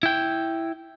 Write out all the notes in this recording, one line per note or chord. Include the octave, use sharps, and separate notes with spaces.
E4 G5